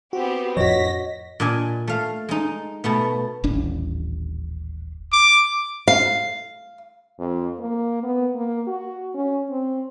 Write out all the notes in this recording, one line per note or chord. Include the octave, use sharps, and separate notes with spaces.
B3 C4 F#4 G4
F2 A2 F3 F#4 C#5 D#5 A#6 B6
A#2 D4 D#5 G#5
A3 F5
G#3 D#4
B2 A3 B3
D#1 A1 D4
D6
F5
F2
A#3
B3
A#3
F#4
C#4
C4